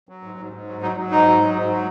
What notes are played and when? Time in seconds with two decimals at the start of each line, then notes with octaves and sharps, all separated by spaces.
0.09 F#3
0.23 G#2
0.38 G#2
0.53 G#2
0.68 F#3
0.82 F#3 D#4
0.97 F#3
1.11 G#2 D#4
1.26 F#3
1.40 F#3
1.55 G#2
1.70 F#3